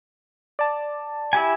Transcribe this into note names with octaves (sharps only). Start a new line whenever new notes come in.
D5 A5
E4 G4 G#5